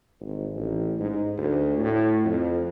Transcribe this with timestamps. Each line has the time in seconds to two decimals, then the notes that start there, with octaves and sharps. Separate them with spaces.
0.21 G#1
0.56 A1
1.00 G#2
1.38 D2
1.78 A2
2.25 F2